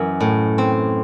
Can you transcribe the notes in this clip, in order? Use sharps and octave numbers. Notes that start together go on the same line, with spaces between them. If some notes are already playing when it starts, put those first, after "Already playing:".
Already playing: F#2 E3
A2
C4